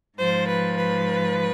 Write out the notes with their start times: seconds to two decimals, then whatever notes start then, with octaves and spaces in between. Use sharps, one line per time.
0.18 G#2 F3 C5
0.47 B4
0.77 B4